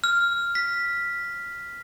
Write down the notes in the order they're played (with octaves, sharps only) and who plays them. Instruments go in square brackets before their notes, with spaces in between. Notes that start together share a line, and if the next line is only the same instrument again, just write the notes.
[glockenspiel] F6
B6